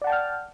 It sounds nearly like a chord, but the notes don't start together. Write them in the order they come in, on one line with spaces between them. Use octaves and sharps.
D5 F#5 A5 G5 F6